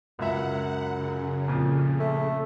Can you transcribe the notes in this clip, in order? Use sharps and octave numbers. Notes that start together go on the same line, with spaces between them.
C#2 F#2 E5 F#5
C#3
F2 A#2 F3
A3